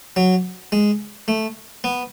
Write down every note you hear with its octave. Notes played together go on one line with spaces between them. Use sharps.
F#3
G#3
A3
B3